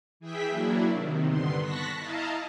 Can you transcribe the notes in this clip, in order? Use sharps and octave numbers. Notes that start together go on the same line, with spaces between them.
E3 G#4 E5 G5 B6
F#3 A#3 D4 E4
C3 D#3
G2 D3 B3 C6
A5 C#6 F#6 A#6 B6
E4 D#5 F5 A5 A#5